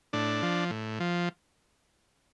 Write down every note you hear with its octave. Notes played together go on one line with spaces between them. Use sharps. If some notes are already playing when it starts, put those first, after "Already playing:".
A2 D4
F3
A2
F3